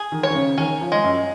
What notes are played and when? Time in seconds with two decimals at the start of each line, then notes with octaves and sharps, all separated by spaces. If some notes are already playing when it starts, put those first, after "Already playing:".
Already playing: G#4
0.12 D#3
0.23 C#5
0.30 D#3
0.35 C#3
0.58 D#3 C#4
0.81 F3
0.92 G#3
1.04 F#2